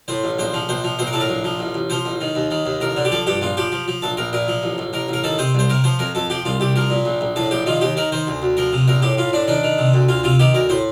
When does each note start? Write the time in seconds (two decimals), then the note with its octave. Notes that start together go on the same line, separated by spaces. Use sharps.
0.08 A2 C5
0.24 A1
0.39 A#1 C5
0.54 F3
0.69 A#1 C5
0.84 F3
0.99 A#1 C5
1.07 A#4
1.13 A2 A4
1.20 A#4
1.29 A#1
1.44 F3
1.59 A1
1.75 A1
1.90 F3 C5
2.05 A1
2.21 D#3
2.35 D#2
2.51 D#3
2.66 D#2
2.81 A1 A#4
2.96 D3
3.05 G4
3.12 F3 A4
3.27 G2 G4
3.41 A#1 F4
3.57 F3 G4
3.72 F3
3.88 F3
4.02 A#1 A4
4.17 A#1 A#4
4.33 A#2 A#4
4.48 F3
4.63 A1
4.78 A1
4.93 A1 A#4
5.08 A1 A#4
5.24 D#3 A4
5.38 C3 C5
5.54 C2 C5
5.70 C3 A#4
5.84 F3 C5
5.99 F2 A#4
6.15 F2 A4
6.30 F3 G4
6.45 C2 F4
6.60 C2 G4
6.76 F3 A#4
6.90 A#2
7.05 A#1
7.21 A#1
7.36 A2 A4
7.51 A#1 G4
7.66 D#3 F4
7.81 D#2 G4
7.97 D#3 A#4
8.12 D#3 C5
8.27 D2
8.42 D2
8.57 F3 A#4
8.73 C3
8.88 A#1 A#4
9.02 A2 G4
9.17 A2 F4
9.33 A2 D4
9.48 D#3 D4
9.63 D#3
9.78 C3
9.94 D2
10.09 D2 F4
10.24 C3 F4
10.39 D#3 G4
10.54 D2 A#4
10.69 A2 C5